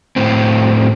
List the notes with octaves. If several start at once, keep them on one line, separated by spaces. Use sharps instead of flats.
A2 C4